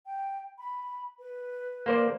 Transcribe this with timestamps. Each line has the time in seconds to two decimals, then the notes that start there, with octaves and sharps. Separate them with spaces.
0.06 G5
0.58 B5
1.19 B4
1.86 A#3 C5 D5